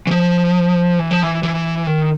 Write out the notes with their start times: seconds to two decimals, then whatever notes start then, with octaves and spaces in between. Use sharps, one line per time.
0.07 E3
0.11 F3
0.99 E3
1.11 F3
1.23 E3
1.43 E3
1.87 D#3